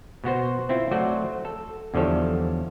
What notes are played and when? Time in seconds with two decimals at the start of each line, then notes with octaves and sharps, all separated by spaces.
0.24 B2 B3 F#4 C5
0.69 C4 E4 F4
0.91 F#3 A3 F#4 C5 D5
1.45 A4
1.94 E2 D3 F3 G3 A4 C#5